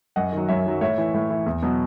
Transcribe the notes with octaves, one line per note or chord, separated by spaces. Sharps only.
F#2 D#5 F#5
D#3 F#3
F#2 C#5 E5
D#3 F#3
A2 C#5 E5
E3
A2
E3
E2
B2 F#3